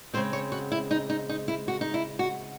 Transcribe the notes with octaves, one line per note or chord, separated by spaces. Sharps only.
C#3 G#3 C4 C5
C#5
F#4
E4
D#4
D#4
D#4
E4
F#4
D#4
E4
F#4